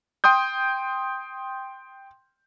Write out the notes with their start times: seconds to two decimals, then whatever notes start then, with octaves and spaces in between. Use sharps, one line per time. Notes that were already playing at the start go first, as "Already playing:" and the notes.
0.24 G5 C6 D#6 G6